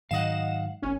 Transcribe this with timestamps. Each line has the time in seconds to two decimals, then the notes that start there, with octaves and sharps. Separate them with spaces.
0.11 G#2 D#3 F#3 D#5 F5 F#5 E7
0.82 G#1 C#4